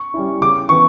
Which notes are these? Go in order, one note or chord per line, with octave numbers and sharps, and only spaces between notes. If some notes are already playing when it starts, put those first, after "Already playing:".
Already playing: C#6
G3 C#4 E4
C#3 D6
E3 B3 C#6